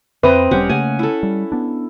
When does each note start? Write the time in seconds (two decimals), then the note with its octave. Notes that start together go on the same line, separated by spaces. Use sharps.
0.23 F2 C4 B4 D#5 E5 A#5
0.51 E1 G3 C#4 G4 F#5
0.69 C#3 A3 A#3 F#5 G#5
0.99 E4 A4
1.23 G3
1.52 B3 D4